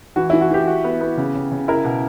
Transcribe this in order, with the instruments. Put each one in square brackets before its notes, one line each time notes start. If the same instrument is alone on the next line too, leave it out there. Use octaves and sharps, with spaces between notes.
[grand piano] E3 [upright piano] F#4
[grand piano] E3 [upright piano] E4
[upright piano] F#4
[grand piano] E3 [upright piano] G4
[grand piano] F#4
B3
B3
C#3
C#3
C#3
[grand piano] E4 [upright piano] A#4
[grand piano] B2